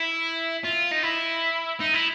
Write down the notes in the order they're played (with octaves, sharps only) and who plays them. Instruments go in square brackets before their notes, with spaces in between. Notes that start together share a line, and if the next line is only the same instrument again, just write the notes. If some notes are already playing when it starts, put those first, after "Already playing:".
Already playing: [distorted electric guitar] E4
F4
D#4
E4
D#4
E4